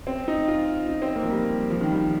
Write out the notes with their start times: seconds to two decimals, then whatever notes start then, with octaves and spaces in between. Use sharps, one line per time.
0.07 C4
0.28 D#4
0.48 F4
0.89 D#4
1.02 C4
1.16 A#3
1.23 F3
1.30 G3
1.70 F3
1.81 D#3
1.91 G3
2.01 D#3